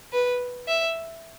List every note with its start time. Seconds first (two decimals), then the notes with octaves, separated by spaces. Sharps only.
0.13 B4
0.68 E5